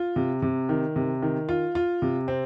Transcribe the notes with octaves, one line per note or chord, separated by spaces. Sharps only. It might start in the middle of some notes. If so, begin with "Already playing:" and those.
Already playing: F4
C3
C3
D#3
C3
D#3
F4
F4
C3
C4